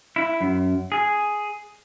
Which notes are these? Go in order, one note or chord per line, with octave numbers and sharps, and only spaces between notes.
E4
F#2
G#4